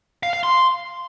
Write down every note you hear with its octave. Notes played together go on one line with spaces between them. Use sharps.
F5
F5
C6